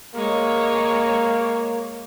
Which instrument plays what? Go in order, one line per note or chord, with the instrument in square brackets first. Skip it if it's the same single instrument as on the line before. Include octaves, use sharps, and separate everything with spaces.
[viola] G#3 C#5 [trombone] A#3